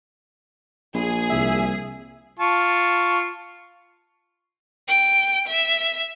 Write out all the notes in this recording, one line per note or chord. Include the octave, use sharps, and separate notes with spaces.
A#1 G#4
C2 E5
F4 A5 C#6
G5
E5